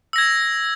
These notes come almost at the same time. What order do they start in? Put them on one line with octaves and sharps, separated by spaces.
E6 A#6 G#6